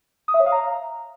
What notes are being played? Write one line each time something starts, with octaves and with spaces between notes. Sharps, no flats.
D#6
E5
C#5
F5
A#5